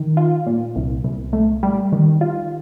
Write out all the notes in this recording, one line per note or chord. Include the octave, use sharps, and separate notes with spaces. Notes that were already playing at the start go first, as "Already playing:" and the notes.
Already playing: D#3
F4
A#2
C2
C2
A3
G3
D#3
F4